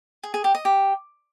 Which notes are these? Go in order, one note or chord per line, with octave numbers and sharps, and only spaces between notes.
G#4
G#4
G4
D#5
G4